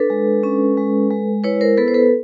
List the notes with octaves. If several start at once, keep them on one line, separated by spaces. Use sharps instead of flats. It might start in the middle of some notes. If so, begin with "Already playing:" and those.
Already playing: D4 A4 B4
G#3
C#4
G#3
G#3
E4 B4 C#5
A#4 C5
B3 A4 B4
C5
A4 B4